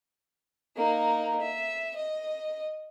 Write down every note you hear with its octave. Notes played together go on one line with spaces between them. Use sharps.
A#3 D#4
E5
D#5